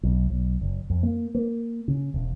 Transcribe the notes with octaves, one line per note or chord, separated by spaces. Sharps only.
B1
B1
F#1
F2
A#3
A#3
C#3
E1